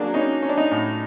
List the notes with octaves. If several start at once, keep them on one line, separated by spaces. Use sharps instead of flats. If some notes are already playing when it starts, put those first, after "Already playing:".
Already playing: F#3 A#3 D4 G#4
C#4 D#4
C#4
D4
D#4
A2